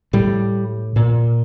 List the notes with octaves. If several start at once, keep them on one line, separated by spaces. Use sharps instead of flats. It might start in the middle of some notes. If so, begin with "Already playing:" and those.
A2 G3
A#2